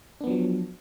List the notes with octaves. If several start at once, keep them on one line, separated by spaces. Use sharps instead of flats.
F3 F#3 B3 D4